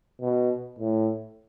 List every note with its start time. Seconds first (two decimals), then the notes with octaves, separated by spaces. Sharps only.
0.21 B2
0.79 A2